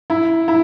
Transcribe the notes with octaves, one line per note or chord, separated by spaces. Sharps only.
E4
E4